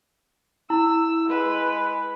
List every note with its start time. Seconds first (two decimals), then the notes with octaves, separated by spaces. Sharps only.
0.70 E4 E6
1.26 G#3 B4